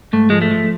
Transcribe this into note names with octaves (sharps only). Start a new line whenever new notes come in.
G#2 A3
F3 G#3
A3
F3